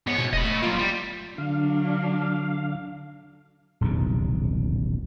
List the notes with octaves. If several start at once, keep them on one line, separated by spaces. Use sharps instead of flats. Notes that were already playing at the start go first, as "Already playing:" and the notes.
G#2 B3 C#5
B2
E1 D#5 B5
A3
F#3 A#3 F4
G3
D3 F#3 D4 F5
D#1 B1 E2 C3